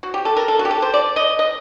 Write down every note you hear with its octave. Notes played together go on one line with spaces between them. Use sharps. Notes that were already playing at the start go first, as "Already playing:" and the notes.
F#4
G4
A4
A#4
A4
F#4
G4
A4
C5
D5
D#5
D#5